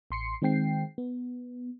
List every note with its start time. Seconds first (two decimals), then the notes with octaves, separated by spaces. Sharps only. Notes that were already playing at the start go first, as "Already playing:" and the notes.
0.11 A1 C6 C7 C#7
0.42 D#3 G#3 C4 G5 C7
0.98 B3